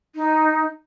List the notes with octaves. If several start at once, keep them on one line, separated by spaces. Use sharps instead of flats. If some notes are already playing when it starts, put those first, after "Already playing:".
D#4